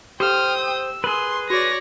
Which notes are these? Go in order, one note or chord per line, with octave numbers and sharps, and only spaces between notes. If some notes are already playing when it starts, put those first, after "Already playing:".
G4 A4 C5 F5 G5 D#6 F6
E6
G#4 A#4 B4 C6
F#4 C#5 D5 A#6